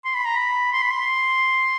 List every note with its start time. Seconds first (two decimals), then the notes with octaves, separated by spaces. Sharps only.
0.05 C6
0.14 B5
0.25 A#5
0.36 B5
0.72 C6
0.82 B5
0.91 C6